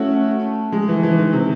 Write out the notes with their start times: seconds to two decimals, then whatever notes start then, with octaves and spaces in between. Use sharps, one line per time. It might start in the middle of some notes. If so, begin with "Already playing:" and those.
Already playing: A3 C#4 E4 F#4
0.72 G#3
0.88 E3
1.03 E3
1.18 D#3
1.33 C3